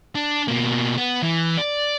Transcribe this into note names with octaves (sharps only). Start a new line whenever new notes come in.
D4
B2 A#3
B3
E3
D5